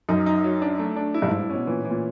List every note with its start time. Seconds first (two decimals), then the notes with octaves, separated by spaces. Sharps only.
0.09 F#2 D#4
0.26 D#4
0.44 F#3
0.62 D4
0.79 A3
0.96 D4
1.14 E4
1.22 G2
1.28 G#2 E4
1.40 A2
1.50 B2 C#4
1.67 A#2 E3
1.79 A2
1.85 E3
1.90 A#2